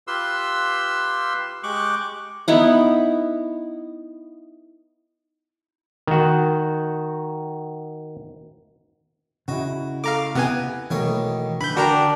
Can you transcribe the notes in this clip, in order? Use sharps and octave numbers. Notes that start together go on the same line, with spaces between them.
F4 G4 B4 C6 E6
G#3 G4 C#6 D6 F#6
B3 D#4 E4 F#5
D#3 F#4
C#3 D#4 E4 F#4
A3 F5 A#5 D6
C3 B3 F#5 G#5
B1 D#3 E3 A3 A#3 C#5
D3 E3 B5 G6
D4 F#4 A#4 G5 A#5